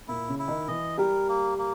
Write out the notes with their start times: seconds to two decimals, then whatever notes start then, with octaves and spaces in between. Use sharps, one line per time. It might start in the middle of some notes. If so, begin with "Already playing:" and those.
0.08 A#2 A#3 E4
0.28 C#3 C#4
0.39 E4
0.48 D#3 D#4
0.68 E3 E4 D#5
0.98 G3 G4 A#4
1.28 A#3
1.58 A#3